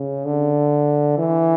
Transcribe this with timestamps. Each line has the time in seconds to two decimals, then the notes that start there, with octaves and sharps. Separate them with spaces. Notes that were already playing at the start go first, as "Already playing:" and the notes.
Already playing: C#3
0.25 D3
1.18 E3